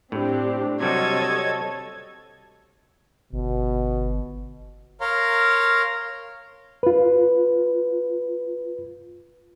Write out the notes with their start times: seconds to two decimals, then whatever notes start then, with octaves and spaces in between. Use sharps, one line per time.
0.12 A2 C4 D4 G4
0.80 C3 F#3 G3 C4 A4 C#5 D#5 G#6
3.33 G1 B2
5.01 A#4 C#5 F5 A#5 C6
6.83 F4 B4